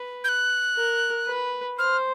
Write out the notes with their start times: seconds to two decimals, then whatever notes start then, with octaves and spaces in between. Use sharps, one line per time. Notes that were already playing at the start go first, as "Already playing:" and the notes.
Already playing: B4
0.24 G6
0.29 F#6
0.76 A#4
1.27 B4
1.79 C5 F6